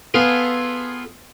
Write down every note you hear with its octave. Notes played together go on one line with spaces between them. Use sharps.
B3 F4 G#4 A4